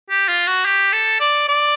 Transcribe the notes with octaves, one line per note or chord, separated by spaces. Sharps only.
G4
F4
F#4
G4
A4
D5
D5